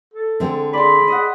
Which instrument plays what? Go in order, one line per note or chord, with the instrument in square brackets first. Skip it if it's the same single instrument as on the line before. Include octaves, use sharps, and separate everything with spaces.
[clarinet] A4
[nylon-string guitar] D3 G#3 C4
[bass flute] G#4 [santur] D5 C6 [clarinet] B5
[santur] D#5 F#5